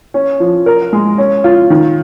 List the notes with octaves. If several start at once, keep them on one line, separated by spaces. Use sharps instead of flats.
C#4
F3
A#4
G#3
C#4
F4
D#3